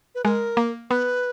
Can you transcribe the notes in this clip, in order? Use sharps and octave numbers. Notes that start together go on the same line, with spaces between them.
B4
G#3 A#4
A#3
B3 B4